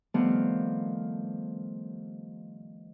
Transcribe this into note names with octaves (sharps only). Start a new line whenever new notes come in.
D#3 F3 G3 A3 B3 C4